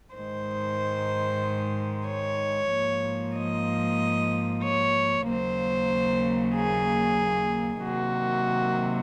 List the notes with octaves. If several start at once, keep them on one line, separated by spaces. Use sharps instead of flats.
G#2 D#3 G#3 C5
C#5
G#2 F3 A#3
D#5
C#5
D#2 C#3 F#3 A#3 C5
G#4
C3 D#3 F#3 A#3 F#4